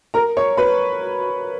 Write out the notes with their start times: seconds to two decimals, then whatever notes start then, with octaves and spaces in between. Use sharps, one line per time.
0.14 A#4 A#5
0.37 C#5 C#6
0.57 B4 B5